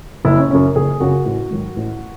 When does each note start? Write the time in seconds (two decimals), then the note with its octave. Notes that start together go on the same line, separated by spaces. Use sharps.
0.25 F#1 E4
0.38 C#4
0.50 F#2 C#3 C#4
0.76 F#1 G#4
1.00 F#2 C#3 F#4
1.25 A1
1.51 G#2 D#3 F#3
1.76 A1